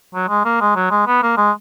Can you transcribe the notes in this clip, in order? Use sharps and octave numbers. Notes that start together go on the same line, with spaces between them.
F#3
G#3
A#3
G#3
F#3
G#3
B3
A#3
G#3